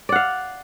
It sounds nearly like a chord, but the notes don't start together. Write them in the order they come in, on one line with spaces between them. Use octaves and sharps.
D5 F#5 F5